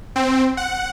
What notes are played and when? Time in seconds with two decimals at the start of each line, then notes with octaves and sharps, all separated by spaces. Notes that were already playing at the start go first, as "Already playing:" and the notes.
0.16 C4
0.57 F#5